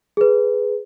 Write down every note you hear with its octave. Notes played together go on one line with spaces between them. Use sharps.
G#4 B4